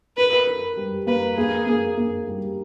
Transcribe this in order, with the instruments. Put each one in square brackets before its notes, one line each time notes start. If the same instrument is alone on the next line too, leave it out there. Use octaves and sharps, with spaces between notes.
[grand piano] A#4 [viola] B4
[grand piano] A#4
G3
[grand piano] A#3 [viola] B4
[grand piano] A#3 [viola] G#4
[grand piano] A#3
A#3
G3